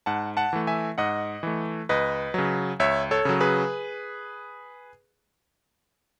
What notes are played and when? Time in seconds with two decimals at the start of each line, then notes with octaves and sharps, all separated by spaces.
0.06 G#2 F#5 A5
0.37 F#5 A5
0.53 E3 A3
0.67 E5 G#5
0.98 G#2 D#5 F#5
1.43 E3 A3
1.89 C#2 B4 D#5
2.34 C#3 F#3
2.80 C#2 C#5 E5
3.11 A4 C#5
3.25 C#3 F#3
3.41 G#4 B4